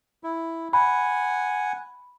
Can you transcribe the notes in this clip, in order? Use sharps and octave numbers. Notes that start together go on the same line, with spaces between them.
E4
F#5 G#5 B5